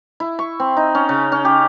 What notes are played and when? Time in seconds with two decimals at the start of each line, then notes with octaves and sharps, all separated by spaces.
0.20 E4
0.39 C#6
0.60 C4
0.77 D#4
0.95 C#4
1.09 C#3
1.32 C#4
1.45 G4